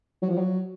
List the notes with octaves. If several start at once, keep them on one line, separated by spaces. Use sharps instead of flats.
F#3
F3
F#3